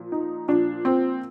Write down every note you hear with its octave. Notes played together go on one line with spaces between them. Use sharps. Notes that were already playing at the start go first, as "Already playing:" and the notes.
Already playing: A#2 F3
D#4
A#2 F3 D4
C4